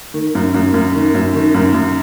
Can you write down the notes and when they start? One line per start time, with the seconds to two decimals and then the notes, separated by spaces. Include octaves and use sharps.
0.14 D#3
0.35 F#2
0.54 F#2
0.74 F#2
0.94 D#3
1.15 F#2
1.34 D#3
1.54 F#2
1.74 F#2